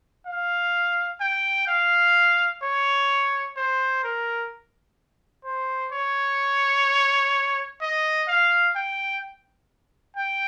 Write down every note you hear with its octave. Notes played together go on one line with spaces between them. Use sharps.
F5
G5
F5
C#5
C5
A#4
C5
C#5
D#5
F5
G5
G5